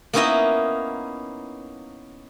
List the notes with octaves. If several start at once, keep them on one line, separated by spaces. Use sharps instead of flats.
A#3 B3 C#4 D#4 E4 D#5